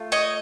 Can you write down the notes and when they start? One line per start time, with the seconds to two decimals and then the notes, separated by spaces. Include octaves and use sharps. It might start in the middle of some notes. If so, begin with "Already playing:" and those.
Already playing: A3 F4
0.12 C#5 D#5